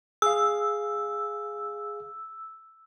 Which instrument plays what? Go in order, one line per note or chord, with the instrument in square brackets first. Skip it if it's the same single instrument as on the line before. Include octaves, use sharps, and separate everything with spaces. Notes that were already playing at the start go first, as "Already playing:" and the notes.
[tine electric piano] G#4 F5 [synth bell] E6